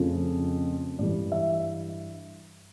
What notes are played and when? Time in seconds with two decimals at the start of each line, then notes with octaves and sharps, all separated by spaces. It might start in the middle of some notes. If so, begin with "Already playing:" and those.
Already playing: F2 C#3 F3 A3
0.99 G2 E3 G3 D5
1.32 E5